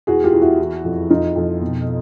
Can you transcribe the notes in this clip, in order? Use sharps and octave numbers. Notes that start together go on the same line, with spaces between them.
E2 F#4 G#4
F4 G4
E2
E4 F#4
E3
F2
F2 D#4 F4
F2
B2